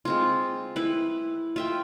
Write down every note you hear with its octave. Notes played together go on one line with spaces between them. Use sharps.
G#3 C4 F4
E4 B4
F4 E5 G5